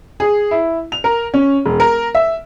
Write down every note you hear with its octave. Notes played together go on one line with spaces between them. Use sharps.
G#4
E4
F7
A#4
C#4
E1
A#4
E5